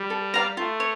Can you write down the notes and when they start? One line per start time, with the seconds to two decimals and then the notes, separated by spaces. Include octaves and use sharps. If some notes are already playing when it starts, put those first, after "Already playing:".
Already playing: G3
0.10 A4
0.34 D5 F5 A#5
0.57 A3 F4
0.80 C#5